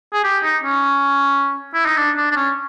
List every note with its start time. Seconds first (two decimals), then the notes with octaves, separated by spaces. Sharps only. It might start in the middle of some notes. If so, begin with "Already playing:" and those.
0.13 G#4
0.24 G4
0.43 D#4
0.63 C#4
1.74 E4
1.86 D#4
1.97 D4
2.17 D4
2.32 D4
2.36 C#4